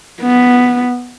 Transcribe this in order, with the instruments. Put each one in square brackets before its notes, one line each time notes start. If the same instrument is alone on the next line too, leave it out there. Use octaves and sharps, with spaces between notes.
[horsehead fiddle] B3